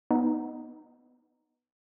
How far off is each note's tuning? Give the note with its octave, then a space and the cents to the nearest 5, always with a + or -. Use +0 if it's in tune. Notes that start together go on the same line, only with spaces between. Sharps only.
B3 +0 D#4 +0